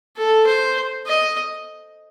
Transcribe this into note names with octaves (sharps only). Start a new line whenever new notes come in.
A4
C5
D#5